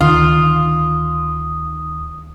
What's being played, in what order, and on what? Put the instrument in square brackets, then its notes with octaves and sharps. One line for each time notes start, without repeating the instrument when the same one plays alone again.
[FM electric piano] D2 D#3 [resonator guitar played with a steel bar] F4 [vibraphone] D#6